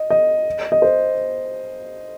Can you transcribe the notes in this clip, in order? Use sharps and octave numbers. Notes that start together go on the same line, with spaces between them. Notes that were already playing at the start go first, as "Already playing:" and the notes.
Already playing: D#5
D#5
D#5
C5